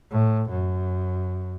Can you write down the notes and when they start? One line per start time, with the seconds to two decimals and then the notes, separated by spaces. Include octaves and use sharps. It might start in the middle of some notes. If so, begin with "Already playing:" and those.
0.11 A2
0.50 F#2